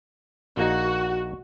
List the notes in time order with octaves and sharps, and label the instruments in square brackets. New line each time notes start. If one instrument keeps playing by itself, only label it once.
[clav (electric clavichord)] A#1 A#3 D#4 [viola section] F#4